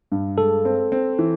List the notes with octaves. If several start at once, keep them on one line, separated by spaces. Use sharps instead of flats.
G2
G#3 A4
C4
C4
E3